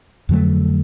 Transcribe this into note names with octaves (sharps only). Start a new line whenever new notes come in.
F2 D3 F#3 A3